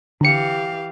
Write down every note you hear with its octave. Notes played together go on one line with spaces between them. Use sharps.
D3 E3 G4 F5 C#7